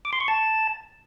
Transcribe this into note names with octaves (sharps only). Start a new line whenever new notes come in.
D6
C6
C#6
A5